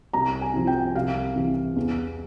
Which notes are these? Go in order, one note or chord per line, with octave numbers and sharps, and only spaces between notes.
C2 A#5
G#5
C3 F3
G5
C2 F5
C3 E3
E2